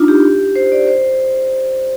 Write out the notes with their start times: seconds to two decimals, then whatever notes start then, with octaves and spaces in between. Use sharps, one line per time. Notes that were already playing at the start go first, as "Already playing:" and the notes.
Already playing: D4 D#4 F4
0.08 G4
0.56 C5
0.72 D5
0.88 C5